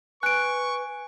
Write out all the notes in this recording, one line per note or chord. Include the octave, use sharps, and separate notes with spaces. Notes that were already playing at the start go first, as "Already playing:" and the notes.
B4 G#5 C#6 F#6 D7